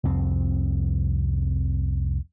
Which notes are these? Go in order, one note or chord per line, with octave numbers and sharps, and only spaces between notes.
C2 F2 C4